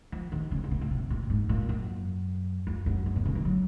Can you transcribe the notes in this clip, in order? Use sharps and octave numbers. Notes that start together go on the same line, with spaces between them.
F3
D#3
C#3
A#2
C3
A#2
C3
A#2
G#2
A#2
F#2
F2
F#2
F#2
A#2
C#3
D#3
F#3